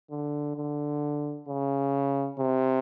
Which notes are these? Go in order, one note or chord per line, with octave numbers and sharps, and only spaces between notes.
D3
D3
C#3
C3